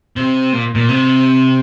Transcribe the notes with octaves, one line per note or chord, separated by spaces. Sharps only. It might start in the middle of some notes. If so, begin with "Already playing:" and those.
C3
A#2
A#2
C3